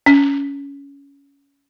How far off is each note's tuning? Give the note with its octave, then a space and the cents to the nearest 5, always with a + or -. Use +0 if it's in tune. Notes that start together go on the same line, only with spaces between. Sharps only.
C#4 +15